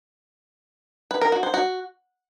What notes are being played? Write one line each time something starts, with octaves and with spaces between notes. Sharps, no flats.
B4
A#4
F#4
C5
F#4